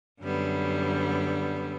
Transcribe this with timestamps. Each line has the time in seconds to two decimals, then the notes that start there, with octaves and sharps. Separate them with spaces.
0.20 F#2 D3 G3 B3